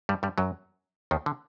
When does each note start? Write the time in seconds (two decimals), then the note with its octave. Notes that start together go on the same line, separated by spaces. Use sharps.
0.09 G2 G3
0.23 G2 G3
0.38 F#2 F#3
1.11 D#2 D#3
1.26 D3